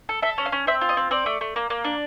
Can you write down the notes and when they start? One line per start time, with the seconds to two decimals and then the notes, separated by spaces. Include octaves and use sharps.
0.09 A4
0.22 A4 E5
0.38 C#4
0.46 F5
0.52 C#4
0.67 C4 E5
0.81 F4
0.89 D#5
0.97 C4
1.11 C4 D5
1.26 A3
1.41 A3
1.56 A#3
1.70 A#3
1.84 D4